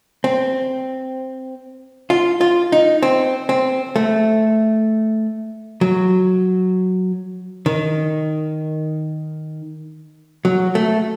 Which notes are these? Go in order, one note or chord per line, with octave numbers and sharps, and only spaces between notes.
C4
F4
F4
D#4
C4
C4
A3
F#3
D#3
F#3
A3